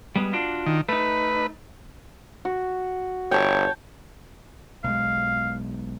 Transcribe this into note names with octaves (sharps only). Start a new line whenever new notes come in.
G3 G#3 B3
D4 F4 F#4
D#3
A3 D#4 B4
F#4
G1 C#5 G5 A5
B1 G#3 F5